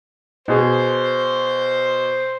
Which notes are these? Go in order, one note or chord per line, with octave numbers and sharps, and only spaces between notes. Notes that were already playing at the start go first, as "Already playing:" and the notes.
B2 G#4 C5